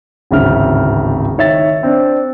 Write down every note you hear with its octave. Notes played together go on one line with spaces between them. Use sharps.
D1 G#1 C#3 E5 F6
D#3 C#5 E5 A6
C4 D4